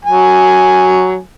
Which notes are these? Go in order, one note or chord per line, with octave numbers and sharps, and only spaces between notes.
F#3 G#5